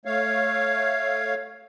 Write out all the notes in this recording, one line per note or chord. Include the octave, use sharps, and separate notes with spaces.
A3 C#5 F5